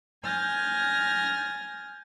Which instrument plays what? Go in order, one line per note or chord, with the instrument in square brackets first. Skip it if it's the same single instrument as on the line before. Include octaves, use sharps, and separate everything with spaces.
[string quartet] G#5 F6 G6 A6 A#6